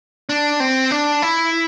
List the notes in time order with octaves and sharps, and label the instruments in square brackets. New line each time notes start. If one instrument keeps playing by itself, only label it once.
[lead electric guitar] D4
C4
D4
E4